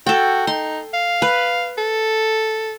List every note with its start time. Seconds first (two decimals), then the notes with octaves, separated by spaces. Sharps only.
0.07 F#4 A4 G5
0.47 D#4 C6
0.93 F5
1.22 B4
1.78 A4